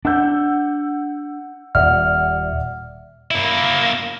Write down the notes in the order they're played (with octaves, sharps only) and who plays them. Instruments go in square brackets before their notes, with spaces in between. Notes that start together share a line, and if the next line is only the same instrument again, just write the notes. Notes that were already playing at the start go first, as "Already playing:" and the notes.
[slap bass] D4 [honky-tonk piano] F#5 E6 G6
[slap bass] D#1 [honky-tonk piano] D5 E5 F#5 [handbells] F6
[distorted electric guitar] A#3 E4